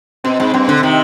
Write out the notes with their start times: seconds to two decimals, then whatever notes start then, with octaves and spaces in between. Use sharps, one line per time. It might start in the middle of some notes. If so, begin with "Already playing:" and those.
0.24 B2 C4
0.39 G#2 C4
0.54 G2 C4
0.68 D3 C4
0.83 C3 D#3 D#4